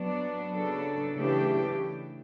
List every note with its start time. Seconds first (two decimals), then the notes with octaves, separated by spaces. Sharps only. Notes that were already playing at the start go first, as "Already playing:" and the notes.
Already playing: F#3 B3 D4
0.53 C#3 F#3 B3 D4 A4
1.13 C#3 E3 A3 D4 G4